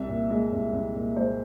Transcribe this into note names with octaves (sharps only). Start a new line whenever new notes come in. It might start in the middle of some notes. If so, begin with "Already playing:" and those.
Already playing: C2 E5
A#2
G#3
C2
C2
A#2
G#3 C5